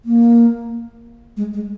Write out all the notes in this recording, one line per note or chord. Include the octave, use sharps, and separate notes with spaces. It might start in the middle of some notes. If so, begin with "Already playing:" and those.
A#3
G#3
G#3